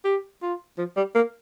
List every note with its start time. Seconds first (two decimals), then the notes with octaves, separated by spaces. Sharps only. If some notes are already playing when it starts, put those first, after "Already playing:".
0.05 G4
0.42 F4
0.78 F3
0.96 G3
1.15 A#3